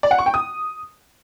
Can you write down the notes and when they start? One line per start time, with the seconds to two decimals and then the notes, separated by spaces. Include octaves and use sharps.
0.03 D5
0.11 F#5
0.19 C#6
0.26 G5
0.34 D#6